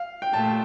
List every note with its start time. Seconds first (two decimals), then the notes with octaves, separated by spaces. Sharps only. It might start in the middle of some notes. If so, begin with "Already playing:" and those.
Already playing: F5
0.22 G5
0.33 A#2 A3 A5